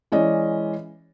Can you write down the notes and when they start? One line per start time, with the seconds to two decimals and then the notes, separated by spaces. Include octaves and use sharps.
0.12 E3 G#3 C#4 D5 D#5